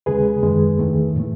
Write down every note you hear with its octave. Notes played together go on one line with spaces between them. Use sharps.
D#2 C#3 G#3 G#4 B4
F#2 D#3 G#3
E2 D#3 A3
A2 E3 A3